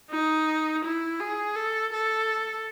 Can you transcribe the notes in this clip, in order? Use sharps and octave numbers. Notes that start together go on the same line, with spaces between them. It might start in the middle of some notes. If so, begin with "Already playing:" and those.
D#4
E4
G#4
A4
A4